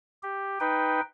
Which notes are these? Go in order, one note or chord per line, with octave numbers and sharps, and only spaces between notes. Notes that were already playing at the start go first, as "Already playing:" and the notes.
G4
D#4 B4 G5